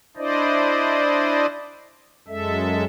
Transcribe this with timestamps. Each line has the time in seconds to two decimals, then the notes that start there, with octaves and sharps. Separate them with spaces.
0.17 D4 E4 C5 D5 D#5
2.28 F#2 G#3 A4 E5